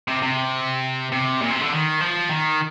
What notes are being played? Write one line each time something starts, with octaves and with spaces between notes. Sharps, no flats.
C3
C3
C3
A#2
C3
D3
D#3
F3
D#3